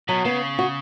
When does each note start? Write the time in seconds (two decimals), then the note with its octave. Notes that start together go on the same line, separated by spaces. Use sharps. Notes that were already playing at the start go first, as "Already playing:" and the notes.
0.08 B2 F#3
0.25 C#3 B3
0.59 F#4